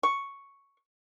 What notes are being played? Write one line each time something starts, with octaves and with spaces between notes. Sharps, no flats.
C#6